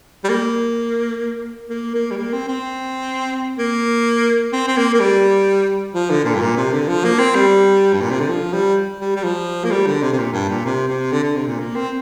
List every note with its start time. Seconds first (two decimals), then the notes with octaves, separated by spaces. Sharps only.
0.24 G3
0.29 A#3
1.70 A#3
1.94 A#3
2.11 G3
2.16 A#3
2.33 C4
2.48 C4
3.58 A#3
4.53 C4
4.67 C4
4.77 A#3
4.94 A#3
4.99 G3
5.94 F3
6.10 D3
6.25 A#2
6.35 G2
6.41 A#2
6.57 C3
6.72 D3
6.88 F3
7.04 A#3
7.19 C4
7.35 G3
7.93 G2
8.01 A#2
8.11 C3
8.19 D3
8.29 F3
8.53 G3
9.00 G3
9.16 G3
9.24 F3
9.64 A#3
9.71 G3
9.86 D3
10.02 C3
10.12 C3
10.18 A#2
10.33 G2
10.49 A#2
10.65 C3
10.88 C3
11.11 D3
11.23 D3
11.35 C3
11.47 A#2
11.59 A#3
11.75 C4